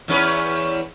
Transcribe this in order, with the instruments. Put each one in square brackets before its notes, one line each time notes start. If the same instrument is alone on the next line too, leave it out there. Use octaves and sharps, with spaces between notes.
[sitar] E2 C#4 B4